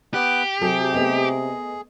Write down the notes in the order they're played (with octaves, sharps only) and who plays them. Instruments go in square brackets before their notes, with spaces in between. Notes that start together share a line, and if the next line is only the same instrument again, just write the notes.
[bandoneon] B3 F#6 [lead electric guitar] G4
[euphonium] C3 [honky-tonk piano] F#3 A4 [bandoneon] G#4
[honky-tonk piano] A3 B3 D#5